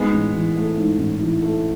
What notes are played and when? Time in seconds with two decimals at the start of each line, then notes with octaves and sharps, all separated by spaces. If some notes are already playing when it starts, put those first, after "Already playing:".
Already playing: G#2 G#3 B3
0.12 A1
0.34 E3
0.56 A3
0.77 G#2
0.98 A1
1.21 E3
1.42 A3